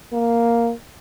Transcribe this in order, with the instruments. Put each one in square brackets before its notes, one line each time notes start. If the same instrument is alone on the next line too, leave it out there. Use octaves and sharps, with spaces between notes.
[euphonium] A#3